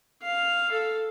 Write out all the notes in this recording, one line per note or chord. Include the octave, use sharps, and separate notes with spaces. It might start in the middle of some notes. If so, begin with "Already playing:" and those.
F5
A4